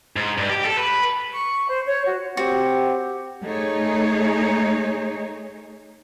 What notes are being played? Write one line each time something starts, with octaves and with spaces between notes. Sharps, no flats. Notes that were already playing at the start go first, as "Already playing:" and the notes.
G#2
G2
G4
A4
B4
C#6
C5
C#5
F#4
C4 F#4 G4
A3 D#4 G#4 C#5